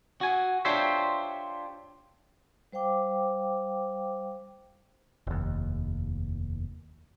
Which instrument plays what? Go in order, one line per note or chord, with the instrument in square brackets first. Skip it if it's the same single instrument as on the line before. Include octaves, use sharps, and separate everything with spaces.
[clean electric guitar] F#4 G#5
D4 F4 G4 C5 C#5 E5
[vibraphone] G3 C5 F5 G5 D6
[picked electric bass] F1 D#2